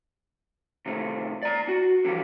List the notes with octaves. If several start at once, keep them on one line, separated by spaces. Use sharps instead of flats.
C3 D#3 A3
D5 A#5
F#4
D3 E3 F3 G3